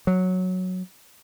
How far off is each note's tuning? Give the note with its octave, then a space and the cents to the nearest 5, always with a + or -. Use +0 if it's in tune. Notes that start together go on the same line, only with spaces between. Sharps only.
F#3 -5